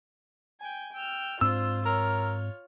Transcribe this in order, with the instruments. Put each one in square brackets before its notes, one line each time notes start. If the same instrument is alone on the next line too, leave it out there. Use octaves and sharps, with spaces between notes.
[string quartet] G5 G#5
G5 E6 F6
[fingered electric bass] G#2 C4 [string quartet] D4 F4 C5 [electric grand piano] E6
[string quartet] F4 C#5 F6 [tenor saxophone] A#4